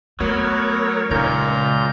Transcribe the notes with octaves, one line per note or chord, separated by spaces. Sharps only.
F#3 A3 B3 A#4 C#5
C#2 A#2 C#3 D#4 A#5 G6